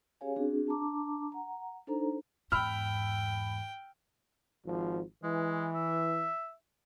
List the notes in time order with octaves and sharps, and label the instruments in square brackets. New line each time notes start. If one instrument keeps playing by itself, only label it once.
[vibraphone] C#4 G4 G#4 C#5 F5 G#5
C4 D4 F#4 G#4
D4 A5 A#5 D6
F#5 A#5
D4 D#4 A4 C5 A#5
[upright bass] E2 G#2 [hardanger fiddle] G5 [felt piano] B5 E6 F6
[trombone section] G#1 F3
[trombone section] E3 [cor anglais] G#3
[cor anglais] E5